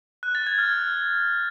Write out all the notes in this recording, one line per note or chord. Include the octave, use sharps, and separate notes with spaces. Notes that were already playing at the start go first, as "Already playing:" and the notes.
F#6
A6
G#6
F6